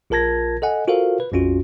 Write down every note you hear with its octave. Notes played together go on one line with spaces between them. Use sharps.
A#1 F4 A#4 A5 G#6 A#6
A4 D#5 F#5 G#5
F4 F#4 A4 A#4 C5 F5
B4
A#1 F2 C#4 F4 F#4